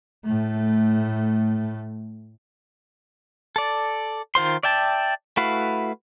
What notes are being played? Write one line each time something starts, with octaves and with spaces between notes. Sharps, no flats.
A2 A3
A4 D5
D#3 F4 C5 C6
D5 E5 G5 A5
A3 E4 F#4 B4 F5